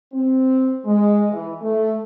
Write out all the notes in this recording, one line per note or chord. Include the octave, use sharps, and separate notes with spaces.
C4
G#3
E3
A3